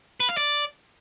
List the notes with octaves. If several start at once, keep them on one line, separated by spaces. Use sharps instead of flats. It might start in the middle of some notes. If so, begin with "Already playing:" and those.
B4
F5
D5